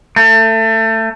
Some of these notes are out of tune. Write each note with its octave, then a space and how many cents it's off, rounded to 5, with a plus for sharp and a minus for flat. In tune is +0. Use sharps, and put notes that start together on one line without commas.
A3 +25